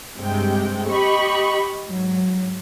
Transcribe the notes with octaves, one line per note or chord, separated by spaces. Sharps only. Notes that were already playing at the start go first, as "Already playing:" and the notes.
G2 C3 G#3 G5
G4 D#5 B5 C#6
G#2 F#3